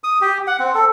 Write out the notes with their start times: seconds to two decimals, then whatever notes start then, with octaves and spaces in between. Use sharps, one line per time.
0.04 D#6
0.21 G4
0.47 F#5
0.59 C4
0.75 A4